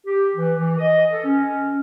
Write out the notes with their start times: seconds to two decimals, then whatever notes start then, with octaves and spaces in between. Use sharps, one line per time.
0.07 G4
0.35 E3
0.58 E3
0.78 D#5
1.12 A4
1.25 C#4